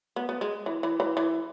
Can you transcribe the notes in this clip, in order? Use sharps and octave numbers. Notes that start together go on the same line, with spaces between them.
B3
B3
G#3
E3
E3
E3
E3